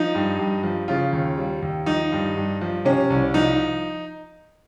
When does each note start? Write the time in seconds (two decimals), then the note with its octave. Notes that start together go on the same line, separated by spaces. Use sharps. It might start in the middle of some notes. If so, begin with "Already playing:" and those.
Already playing: F3 D#4
0.15 G2
0.39 G2
0.63 F3
0.88 C#3 F4
1.13 D#2
1.38 G3
1.62 D#2
1.86 F3 D#4
2.12 G2
2.37 G2
2.61 F3
2.85 C3 C#4
3.10 C2
3.34 F3 D#4